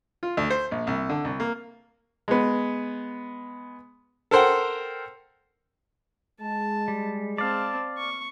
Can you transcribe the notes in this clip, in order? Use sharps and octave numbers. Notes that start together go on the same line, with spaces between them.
F4
D2
C5
A#1
C2
D3
C2
A#3
G#3 B3
A4 A#4 C5 F#5 G5
G#3 A5
G3
C4 D5 F5 A5
C#6